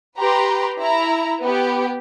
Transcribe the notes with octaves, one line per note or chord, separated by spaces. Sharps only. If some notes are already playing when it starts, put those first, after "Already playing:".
G4 B4 A#5 C6
E4 A#5
B3 G4